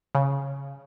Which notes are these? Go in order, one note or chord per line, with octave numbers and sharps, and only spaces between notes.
C#3